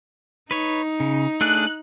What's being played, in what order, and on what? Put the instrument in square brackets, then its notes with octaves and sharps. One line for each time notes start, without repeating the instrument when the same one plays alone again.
[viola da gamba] D#4 [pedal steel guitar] B4 C#5
[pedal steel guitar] C#3
[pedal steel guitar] A3 D4 G#4 [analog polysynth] F#6